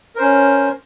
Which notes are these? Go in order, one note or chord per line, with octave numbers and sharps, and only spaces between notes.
C#4 A#4 C5